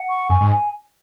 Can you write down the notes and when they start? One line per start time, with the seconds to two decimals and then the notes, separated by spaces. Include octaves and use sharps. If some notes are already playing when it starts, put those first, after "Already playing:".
Already playing: F#5
0.09 C#6
0.29 F#2 G#5
0.41 G#2
0.51 G#5